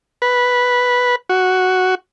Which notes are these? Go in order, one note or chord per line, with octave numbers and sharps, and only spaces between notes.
B4
F#4